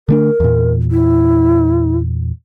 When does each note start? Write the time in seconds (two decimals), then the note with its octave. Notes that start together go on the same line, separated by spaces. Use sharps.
0.09 D3 A3 D4 A#4
0.40 E2 A#2
0.91 E4